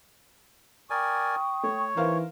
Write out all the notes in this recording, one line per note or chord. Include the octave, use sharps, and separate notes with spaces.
A#4 D5 G5 G#5 C#6 D#6
A3 C#5
E3 D#4 A#4 C5 F5